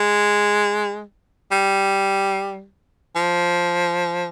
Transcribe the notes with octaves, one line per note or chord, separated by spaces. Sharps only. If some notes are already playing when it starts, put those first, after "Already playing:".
Already playing: G#3
G3
F3